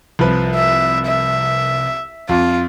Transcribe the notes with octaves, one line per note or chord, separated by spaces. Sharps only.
C2 F3 B4
E5
E5
F2 F4